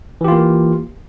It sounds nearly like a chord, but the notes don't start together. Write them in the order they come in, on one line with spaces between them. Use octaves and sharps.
E3 G4 F4 A#3